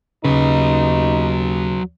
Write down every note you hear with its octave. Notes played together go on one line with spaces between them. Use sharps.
D#2 C#3 F#3 D#4 B4